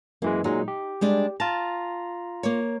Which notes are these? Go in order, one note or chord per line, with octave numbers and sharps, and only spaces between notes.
F#2 E3 G#3 A#3
A#2 F#3 G#3 D#4
G4
G3 G#3 D4
F4 A5 A#5
A#3 C#5